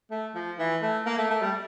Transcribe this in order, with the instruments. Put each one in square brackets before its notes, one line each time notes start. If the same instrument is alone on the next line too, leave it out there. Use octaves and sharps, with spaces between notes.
[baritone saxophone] A3
F3
E3
A3
A#3
A3
A3
G3